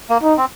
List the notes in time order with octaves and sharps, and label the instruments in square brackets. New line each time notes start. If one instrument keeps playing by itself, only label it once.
[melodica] A#3
[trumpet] D#4
[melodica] C4